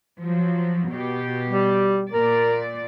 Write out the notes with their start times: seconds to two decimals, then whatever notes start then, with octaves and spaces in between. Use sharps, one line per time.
0.20 F3 F#3
0.91 B2 G4
1.49 G3
2.12 A#2 A#4 D5